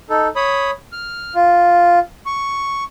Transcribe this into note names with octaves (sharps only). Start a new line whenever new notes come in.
D#4 A4
C#5 B5 D#6
F6
F4
C#6